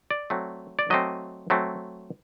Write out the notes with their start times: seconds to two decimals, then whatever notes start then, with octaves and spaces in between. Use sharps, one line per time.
0.10 D5
0.30 F#3 A3 C4
0.79 D5
0.90 F#3 A3 C4 D#5
1.50 F#3 A3 C4